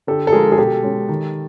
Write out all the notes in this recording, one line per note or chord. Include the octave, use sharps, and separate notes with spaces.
D3 G4 A4
A4
F3 G#3 G#4 A#4
G#4
B2 G4 A4
G#3 C#4
D#3